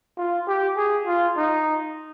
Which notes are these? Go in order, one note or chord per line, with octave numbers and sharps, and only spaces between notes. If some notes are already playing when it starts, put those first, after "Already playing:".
F4
G4
G#4
F4
D#4